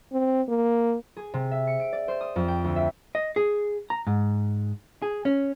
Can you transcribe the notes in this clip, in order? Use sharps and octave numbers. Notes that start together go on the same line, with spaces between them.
C4
A#3
G#4
C3
E5
C#7
D7
D5
C5
D#6
F2
G5
D2
E5
D#5
G#4
A#5
G#2
G#4
C#4